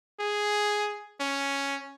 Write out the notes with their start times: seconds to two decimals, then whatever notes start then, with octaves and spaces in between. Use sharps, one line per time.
0.20 G#4
1.20 C#4